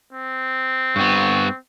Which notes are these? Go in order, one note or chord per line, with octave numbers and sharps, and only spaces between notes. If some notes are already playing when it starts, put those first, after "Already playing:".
C4
G2 B3 C#6